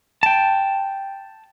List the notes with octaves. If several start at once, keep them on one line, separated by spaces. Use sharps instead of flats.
G5 A5